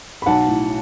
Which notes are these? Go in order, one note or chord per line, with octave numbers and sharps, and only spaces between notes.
B5
B1 F#5 A5
A2